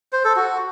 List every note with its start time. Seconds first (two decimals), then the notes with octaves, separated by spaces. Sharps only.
0.13 C5
0.24 A4
0.36 F#4